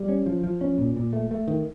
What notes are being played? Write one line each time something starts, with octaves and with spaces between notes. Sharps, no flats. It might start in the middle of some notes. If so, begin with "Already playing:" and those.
Already playing: G3
C#4
F3
F3
C#4
A#2
A#2
A3
A3
D#3